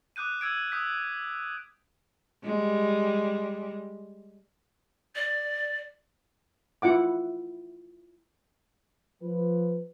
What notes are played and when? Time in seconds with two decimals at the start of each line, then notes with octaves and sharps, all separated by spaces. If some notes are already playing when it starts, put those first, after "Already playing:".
0.16 D6 D#6 F#6 G6 D#7
0.41 E6 G#6 D7
0.72 D#6 G6 B6
2.44 G3 G#3
5.15 D5
6.82 E4 F4 F#5 D6
9.22 F3 B4